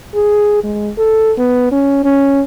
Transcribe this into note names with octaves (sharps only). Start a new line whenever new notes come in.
G#4
G#3
A4
B3
C#4
C#4